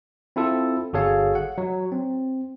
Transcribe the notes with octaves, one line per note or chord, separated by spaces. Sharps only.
C4 E4 F4 A4
G1 F#4 G#4 A4 C#5 F5
F#5
F#3
C4